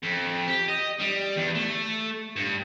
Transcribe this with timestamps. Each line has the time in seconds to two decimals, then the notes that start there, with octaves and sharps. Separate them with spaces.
0.03 F2
0.48 G4
0.68 D#5
0.99 G3
1.36 E2
1.55 A3
2.36 G2